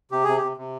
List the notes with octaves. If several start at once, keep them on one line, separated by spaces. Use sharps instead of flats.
C3 G4
C3 G#4
G4
C3
C3